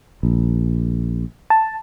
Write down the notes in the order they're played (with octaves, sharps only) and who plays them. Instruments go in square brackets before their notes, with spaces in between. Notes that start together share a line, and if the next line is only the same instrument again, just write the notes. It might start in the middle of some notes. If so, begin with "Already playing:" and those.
[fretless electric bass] A#1
[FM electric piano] A5